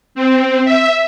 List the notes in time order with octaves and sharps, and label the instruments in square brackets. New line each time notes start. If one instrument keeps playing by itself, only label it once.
[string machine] C4
E5